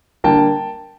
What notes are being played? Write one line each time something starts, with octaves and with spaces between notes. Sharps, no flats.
D3 G3 A#3 G5 A5